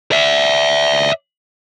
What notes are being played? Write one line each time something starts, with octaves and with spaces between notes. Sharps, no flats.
D5 E5